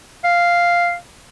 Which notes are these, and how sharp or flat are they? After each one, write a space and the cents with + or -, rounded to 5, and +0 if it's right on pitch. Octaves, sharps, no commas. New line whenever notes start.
F5 -5